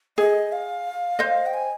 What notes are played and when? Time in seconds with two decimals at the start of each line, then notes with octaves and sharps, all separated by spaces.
0.18 G#4 D#5
0.52 F5
1.19 C5 D#5
1.46 G5
1.53 G#5